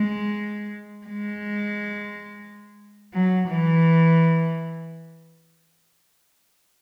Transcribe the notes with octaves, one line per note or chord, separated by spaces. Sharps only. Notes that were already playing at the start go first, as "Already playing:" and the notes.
Already playing: G#3
G#3
F#3
E3